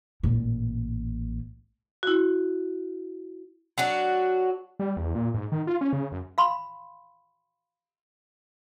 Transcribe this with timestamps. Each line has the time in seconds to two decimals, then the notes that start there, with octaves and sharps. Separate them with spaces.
0.23 A1 A#2
2.03 E4 F#4
3.78 F#3 D4 F#4
4.79 G3
4.97 E2
5.15 A#2
5.34 G#2
5.52 D#3
5.67 F4
5.81 C#4
5.93 C#3
6.12 F#2
6.38 F5 B5 C6